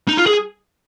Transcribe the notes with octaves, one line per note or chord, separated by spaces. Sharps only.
D#4
F4
G#4